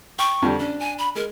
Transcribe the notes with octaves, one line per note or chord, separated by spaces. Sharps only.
G5 C#6
F2 D3 G3
C#4 D4
G#5
B5
G#3 A#4